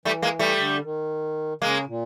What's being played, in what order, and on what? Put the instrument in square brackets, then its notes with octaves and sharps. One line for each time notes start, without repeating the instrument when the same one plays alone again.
[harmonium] E3 [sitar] G3 A3
[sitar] G#3 A#3
G3 A3
[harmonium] D3
D#3
[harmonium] C#3 [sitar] G#3 A#3
[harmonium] A#2